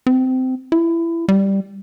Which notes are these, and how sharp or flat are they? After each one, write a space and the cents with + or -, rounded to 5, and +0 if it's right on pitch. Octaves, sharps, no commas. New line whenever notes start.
C4 -20
E4 +20
G3 +0